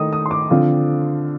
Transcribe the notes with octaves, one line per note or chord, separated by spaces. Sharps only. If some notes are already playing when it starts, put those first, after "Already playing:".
Already playing: D#3 A3 D#4 D#6
D#6
C6
D6
D3 F3 C4 F4